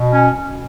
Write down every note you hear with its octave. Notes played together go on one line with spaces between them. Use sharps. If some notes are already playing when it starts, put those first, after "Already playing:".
Already playing: B2
C#4